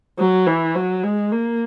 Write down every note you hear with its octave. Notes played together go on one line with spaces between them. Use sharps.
F#3
E3
F#3
G#3
A#3